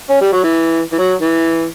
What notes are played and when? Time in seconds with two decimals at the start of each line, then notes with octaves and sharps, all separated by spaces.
0.10 C#4
0.21 G3
0.32 F#3
0.43 E3
0.92 E3
0.99 F#3
1.20 E3